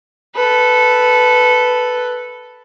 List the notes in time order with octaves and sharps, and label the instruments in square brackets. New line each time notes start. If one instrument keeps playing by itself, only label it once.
[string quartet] A4 B4